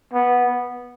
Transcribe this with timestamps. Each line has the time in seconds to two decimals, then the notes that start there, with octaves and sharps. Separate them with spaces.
0.14 B3